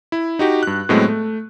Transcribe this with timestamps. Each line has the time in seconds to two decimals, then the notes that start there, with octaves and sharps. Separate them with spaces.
0.12 E4
0.39 D#4 F#4 G4
0.63 G2 F#6
0.89 A2 F#3 G#3 A3 B3 C4
1.08 A3